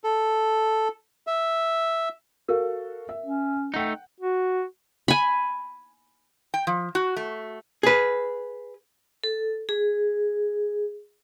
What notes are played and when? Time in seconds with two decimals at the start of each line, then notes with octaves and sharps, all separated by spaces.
0.04 A4
1.27 E5
2.48 F#4 A4 A#4 F5
3.09 E5
3.26 C#4
3.74 A3 D#4 F#5 G5
4.20 F#4
5.08 G#5 B5
6.54 G5
6.67 F3
6.95 F#4
7.16 A3
7.83 G#4 B4
9.24 A4
9.69 G#4